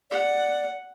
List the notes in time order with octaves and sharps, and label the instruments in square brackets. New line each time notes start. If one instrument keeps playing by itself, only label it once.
[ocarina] D5 [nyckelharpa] F#5